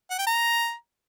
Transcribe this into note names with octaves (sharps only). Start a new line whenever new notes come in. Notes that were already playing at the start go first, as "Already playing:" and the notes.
F#5
G5
A#5